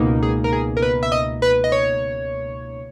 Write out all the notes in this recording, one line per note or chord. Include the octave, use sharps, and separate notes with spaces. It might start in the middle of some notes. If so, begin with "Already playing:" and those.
Already playing: C#2 B2 A#3 D#4
G#4
A#4
G#4
A#4
B4
E5
D#5
B4
D#5
C#5